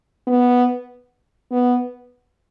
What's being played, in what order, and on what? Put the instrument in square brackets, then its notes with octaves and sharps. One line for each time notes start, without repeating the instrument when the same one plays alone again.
[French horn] B3
B3